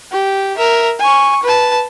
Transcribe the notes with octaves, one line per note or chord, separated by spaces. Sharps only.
G4
A#4 E5
G#5 C#6
B4 A5